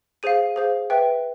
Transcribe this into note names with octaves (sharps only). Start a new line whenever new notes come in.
G#4 C5 F5 D#7
G#4 C5 F5
B4 E5 G5